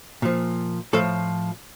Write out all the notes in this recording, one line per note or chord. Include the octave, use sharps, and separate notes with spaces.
A#2 F3
A2 F3 A4